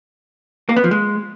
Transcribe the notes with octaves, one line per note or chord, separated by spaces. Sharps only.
A#3
B3
F3
G#3